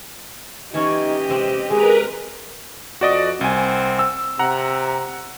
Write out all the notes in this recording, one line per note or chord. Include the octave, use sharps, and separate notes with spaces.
E3 C#4 D#4 G4 C#5 D#5
C3 G#3 C4
G#3 G#4 A#4 B4 A#5
F2 F#4 D5 D#5
C2 C4 G#5
E6
C3 F#5 A#5